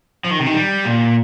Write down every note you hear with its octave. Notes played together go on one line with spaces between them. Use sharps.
F3
D#3
C3
D#3
G3
A#2